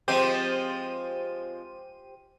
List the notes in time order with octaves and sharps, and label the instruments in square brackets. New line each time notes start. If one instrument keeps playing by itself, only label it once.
[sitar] F3 G#3 C4 [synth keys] G4 C5 D#7